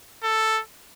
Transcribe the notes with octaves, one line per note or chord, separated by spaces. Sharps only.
A4